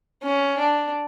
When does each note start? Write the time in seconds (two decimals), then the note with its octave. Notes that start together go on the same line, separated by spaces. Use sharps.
0.23 C#4
0.58 D4